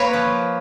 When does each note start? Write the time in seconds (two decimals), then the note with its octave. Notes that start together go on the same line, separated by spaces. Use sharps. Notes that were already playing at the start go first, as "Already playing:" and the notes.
Already playing: A#3 B4 C#5
0.13 F3